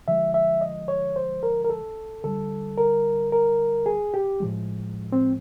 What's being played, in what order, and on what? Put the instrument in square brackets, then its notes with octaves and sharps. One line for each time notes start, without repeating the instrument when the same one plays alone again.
[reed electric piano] D3 F3 G#3 E5
E5
D#5
C#5
C5
A#4
A#4
A4
D3 G3 A4
A#4
A#4
G#4
G4
A2 F3 G#3
C4